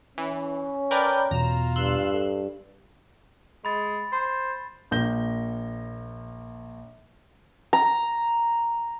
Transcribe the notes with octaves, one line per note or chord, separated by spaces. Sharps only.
E3 C#4
A#4 B4 C#5 D5 G5 A5
E2 B2 F4 A#5 E7
G2 C6 E6 F#6
A4
G#3 B5 A6
C5
A#1 A#3 G6 A#6 G7
A#5